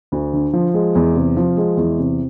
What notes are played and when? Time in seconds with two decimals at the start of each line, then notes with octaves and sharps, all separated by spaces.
0.12 D2
0.34 D3
0.53 F3
0.74 G#3
0.95 E2
1.15 C3
1.37 F3
1.57 G#3
1.77 E2
1.99 C3